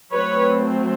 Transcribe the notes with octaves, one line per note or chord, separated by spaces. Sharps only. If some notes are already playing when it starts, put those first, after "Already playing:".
F#3 A3 C4 B4 C#5